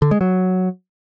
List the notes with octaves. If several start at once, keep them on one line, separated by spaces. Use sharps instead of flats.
D3
G#3
F#3